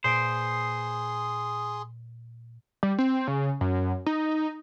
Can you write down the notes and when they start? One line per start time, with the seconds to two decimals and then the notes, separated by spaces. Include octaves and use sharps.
0.04 A#2 G#4 B4 C5 C6 D#6 D7
2.83 G3
2.98 C4
3.28 C#3
3.61 F#2
4.06 D#4